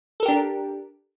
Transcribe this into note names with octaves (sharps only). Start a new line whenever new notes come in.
D4 G4 A4 A#4